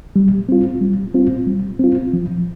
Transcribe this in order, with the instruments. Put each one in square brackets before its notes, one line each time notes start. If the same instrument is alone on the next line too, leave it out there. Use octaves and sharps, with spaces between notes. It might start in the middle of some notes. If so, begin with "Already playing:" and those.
[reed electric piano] G3
C4 F4
G3
C4 F4
G3
C4 F4
F3